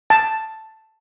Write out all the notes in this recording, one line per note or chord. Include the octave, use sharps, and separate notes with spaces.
A5